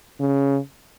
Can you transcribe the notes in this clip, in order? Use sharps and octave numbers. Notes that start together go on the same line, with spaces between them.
C#3